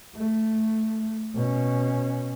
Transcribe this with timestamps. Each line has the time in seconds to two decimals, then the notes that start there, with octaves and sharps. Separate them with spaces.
0.16 A3
1.35 B2 C#4